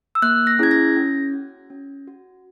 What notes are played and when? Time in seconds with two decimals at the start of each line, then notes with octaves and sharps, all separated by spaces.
0.15 E6
0.22 A#3 F#6
0.47 A#6
0.59 C#4 E4 G#4 G#6
0.71 A#6
0.96 C#4
1.33 F#4
1.70 C#4
2.08 F#4